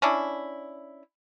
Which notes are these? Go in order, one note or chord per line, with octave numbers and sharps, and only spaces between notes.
C#4 D4 E4